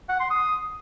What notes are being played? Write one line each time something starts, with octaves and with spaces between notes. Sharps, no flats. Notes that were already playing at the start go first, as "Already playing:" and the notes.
F#5
C6
D#6